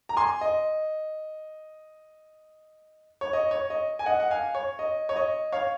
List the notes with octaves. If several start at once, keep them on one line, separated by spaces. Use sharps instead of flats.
A#5
G#5 C6
D#5
C#5
D#5
C#5
D#5
G#5
D#5 F#5
F#5
F5 G#5
C#5
D#5
C#5
D#5
C#5 F5